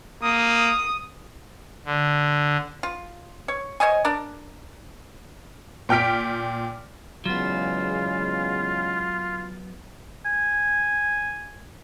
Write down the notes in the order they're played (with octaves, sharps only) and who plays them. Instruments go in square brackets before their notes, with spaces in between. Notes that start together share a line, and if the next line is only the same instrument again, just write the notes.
[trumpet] A#3 [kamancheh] D#6
[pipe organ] D3
[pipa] F4
C#5
C5 C#5 D#5 G#5
D4 A#4 D5
[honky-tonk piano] A#2 G5 F6 B6 D7
[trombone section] E2 C#3 G#3 [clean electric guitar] F#3 B3 [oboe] F4
[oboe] G#5